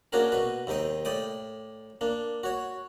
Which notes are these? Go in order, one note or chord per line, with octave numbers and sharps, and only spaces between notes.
A#3 C#4 D4 F#4 G#4 A#4
B2 B4
D#2 C3 D#4 D#5 G5
A2 D5 G5 D#6
A#3 D4
F#4 C#5